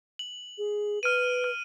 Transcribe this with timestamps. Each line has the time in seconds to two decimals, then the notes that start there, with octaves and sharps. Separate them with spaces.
0.19 F#7
0.58 G#4
1.03 B4 F6 D7 D#7
1.44 F6